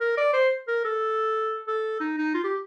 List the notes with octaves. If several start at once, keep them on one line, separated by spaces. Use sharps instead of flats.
A#4
D5
C5
A#4
A4
A4
D#4
D#4
F4
G4